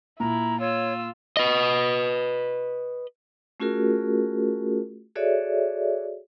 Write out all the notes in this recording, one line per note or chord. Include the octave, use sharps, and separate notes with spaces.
A#2 E4 A#5
F4 C#5 E6
B4 D#5
A3 C#4 F4 F#4 G#4 A#4
F#4 G#4 A4 C#5 D5 E5